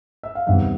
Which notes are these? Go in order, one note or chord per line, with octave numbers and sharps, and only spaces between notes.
E5
F5
E2 C3 D#3 G3 E5 F#5